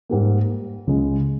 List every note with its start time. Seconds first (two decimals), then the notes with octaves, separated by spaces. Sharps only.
0.09 G#2 G3 A#3
0.87 C#2 C#3 G#3